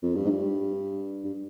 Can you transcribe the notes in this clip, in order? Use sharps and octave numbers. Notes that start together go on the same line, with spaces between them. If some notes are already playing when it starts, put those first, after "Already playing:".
F2
G2
G#2
G2
G2